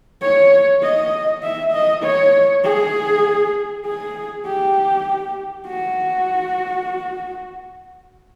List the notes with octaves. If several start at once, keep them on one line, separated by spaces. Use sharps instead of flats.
C#5
D#5
E5
D#5
C#5
G#4
G#4
G4
F#4